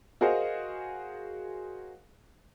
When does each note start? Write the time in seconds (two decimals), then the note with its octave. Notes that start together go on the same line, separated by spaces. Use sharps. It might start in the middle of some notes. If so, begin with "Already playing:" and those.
0.21 F#4 G#4 A#4 C5 D#5 F5